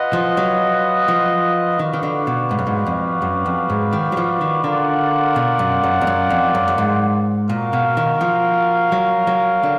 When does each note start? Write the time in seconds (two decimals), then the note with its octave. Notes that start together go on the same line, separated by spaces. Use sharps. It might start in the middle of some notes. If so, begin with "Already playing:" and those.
Already playing: F4 B4 D#5 F#5
0.13 F3
0.37 F#3
1.08 F3
1.79 D#3 F#4 B4 D5 F5
1.94 D#3
2.03 D3
2.27 B2
2.51 G#2
2.59 F#2
2.67 G#2
2.86 F2
3.22 F#2
3.46 F2
3.70 G#2
3.93 D#3
4.12 F#3
4.17 F3
4.41 D#3
4.64 D3 F4 A#4 D5 F#5
5.36 B2
5.59 F#2
5.84 F#2
6.01 F2
6.07 F#2
6.30 F2
6.55 F#2
6.68 F#2
6.78 G#2
7.49 A#2 F#4 A#4 F5
7.73 B2
7.97 D#3
8.21 F3
8.92 F#3
9.27 F#3
9.63 D3